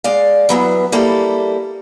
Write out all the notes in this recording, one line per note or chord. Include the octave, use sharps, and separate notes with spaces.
G#3 D5 F5
E3 F#3 B3
G3 A#3 E4 A4